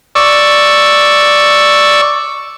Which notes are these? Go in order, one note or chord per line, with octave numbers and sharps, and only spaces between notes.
D5 C#6 E6